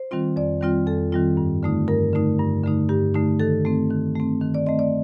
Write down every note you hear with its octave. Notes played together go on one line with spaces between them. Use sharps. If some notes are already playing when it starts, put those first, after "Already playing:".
Already playing: C5
D#3 G3 C4 F4
F2 D5
D#3 G3 C4 F4
F2 A4
D#3 G3 C4 F4
G2
D3 A3 D#4
G2 A#4
D3 A3 D#4
G2
D3 A3 D#4
G2 G4
D3 A3 D#4
D#3 A4
A3 C4
D#3
A3 C4
D#3
D5
A3 C4 D#5
D5